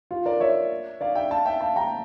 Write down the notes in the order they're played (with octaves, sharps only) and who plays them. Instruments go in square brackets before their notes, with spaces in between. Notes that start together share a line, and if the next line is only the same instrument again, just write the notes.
[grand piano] F4
A#4 D5
C#5 E5
D5 F5
E5 G5
F5 A5
E5 G5
F5 A5
G5 A#5